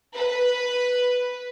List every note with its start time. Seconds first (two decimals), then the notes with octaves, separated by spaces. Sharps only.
0.16 B4